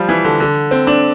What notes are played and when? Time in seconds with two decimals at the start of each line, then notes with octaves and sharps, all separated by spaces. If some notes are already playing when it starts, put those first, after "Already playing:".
Already playing: F3 G3
0.09 E3
0.24 D3
0.40 D3
0.71 C4
0.87 D4